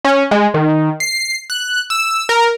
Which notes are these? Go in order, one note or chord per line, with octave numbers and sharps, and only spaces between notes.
C#4
G#3
D#3
C7
F#6
E6
A#4